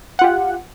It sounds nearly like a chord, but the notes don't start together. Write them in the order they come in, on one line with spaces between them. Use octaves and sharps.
F#5 F4 G4